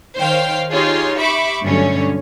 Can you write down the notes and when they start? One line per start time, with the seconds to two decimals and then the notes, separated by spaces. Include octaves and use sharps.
0.17 D#3 C5 C#5 F5 G5
0.71 D#4 F4 G4 G#4 C#5 C6
1.18 G4 E5 B5 C#6 D6
1.62 G2 B2 D3 F#3 A3 C#4